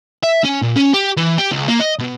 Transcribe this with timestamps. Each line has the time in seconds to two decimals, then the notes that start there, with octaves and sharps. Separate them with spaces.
0.24 E5
0.45 C#4
0.63 A#2
0.76 C#4
0.94 G4
1.17 E3
1.38 G4
1.51 C#2
1.69 A#3
1.81 D#5
2.00 B2